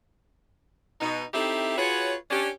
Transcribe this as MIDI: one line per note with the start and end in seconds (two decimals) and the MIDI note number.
1.01 1.24 47
1.01 1.24 63
1.34 1.77 60
1.34 1.77 63
1.34 1.77 64
1.34 1.77 67
1.34 1.77 69
1.34 1.77 76
1.77 2.14 65
1.77 2.14 66
1.77 2.14 68
1.77 2.14 71
1.77 2.14 73
2.31 2.49 61
2.31 2.49 62
2.31 2.49 67